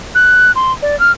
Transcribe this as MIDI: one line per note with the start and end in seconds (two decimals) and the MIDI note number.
0.15 0.52 90
0.56 0.72 84
0.83 0.98 74
1.00 1.11 89